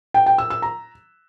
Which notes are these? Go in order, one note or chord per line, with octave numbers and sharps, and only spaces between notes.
G5
G5
E6
E6
A#5